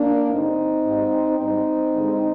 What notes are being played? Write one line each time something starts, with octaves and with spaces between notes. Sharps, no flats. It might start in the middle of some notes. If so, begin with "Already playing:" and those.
Already playing: A#3 D4
G2 D3 G3 C4 D#4
G#2 G3
G#2 G3 C4 D#4
G2 D3 G#3